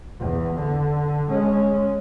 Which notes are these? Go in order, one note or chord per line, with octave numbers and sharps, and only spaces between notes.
E2
D3
G#3 C#4